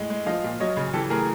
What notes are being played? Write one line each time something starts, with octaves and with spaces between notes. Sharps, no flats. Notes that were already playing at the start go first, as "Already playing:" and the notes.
Already playing: A2 G#3
G#3
F3 D#5 F5
A#2
F#3 C#5 D#5
C#3
E3 G4 A4
A2 G#4 A#4